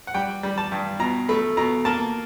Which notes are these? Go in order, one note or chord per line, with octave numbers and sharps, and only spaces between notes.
F#5
G3 G5
G3
A5
G2
B2 A#5
A3 B5
B2 A#5
A#3 A5